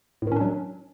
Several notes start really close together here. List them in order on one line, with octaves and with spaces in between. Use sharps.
A2 D#3 C#4 D4 F#3